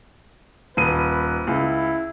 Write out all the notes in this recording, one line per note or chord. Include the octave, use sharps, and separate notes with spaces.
D#1 B4 D#7
C#2 E4